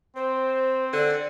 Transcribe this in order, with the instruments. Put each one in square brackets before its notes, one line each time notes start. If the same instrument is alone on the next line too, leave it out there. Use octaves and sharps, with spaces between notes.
[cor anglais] C4 [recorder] C5
[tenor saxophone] D3 [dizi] D5